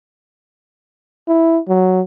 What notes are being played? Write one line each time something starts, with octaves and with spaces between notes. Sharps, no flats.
E4
F#3